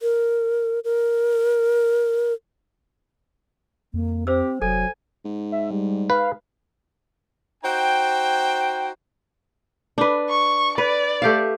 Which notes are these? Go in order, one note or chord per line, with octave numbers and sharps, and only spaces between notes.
A#4
A#4
F2 A#3
C4 G4 C5 E6
F1 F#3 A4 G#5
G#2
E5
G3
B4 F5
D#4 F#4 C5 G5
D4 B4
C#6
B4 D5
A3 G4 F5